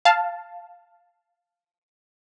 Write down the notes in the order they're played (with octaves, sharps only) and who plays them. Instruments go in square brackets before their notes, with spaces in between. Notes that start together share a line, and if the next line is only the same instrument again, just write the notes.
[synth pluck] F5 A5